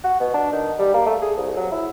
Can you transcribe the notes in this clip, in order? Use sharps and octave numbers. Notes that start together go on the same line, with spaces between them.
F#4
B2
D4
D#3
G3
A#3
A3
G#4
C2
F#3
E4